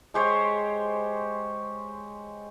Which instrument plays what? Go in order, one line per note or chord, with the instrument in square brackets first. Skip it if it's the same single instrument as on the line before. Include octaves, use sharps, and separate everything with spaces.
[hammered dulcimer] G#3 G4 C5 C#5